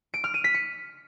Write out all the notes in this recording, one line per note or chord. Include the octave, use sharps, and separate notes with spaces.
D7
F6
D#7
B6
C#7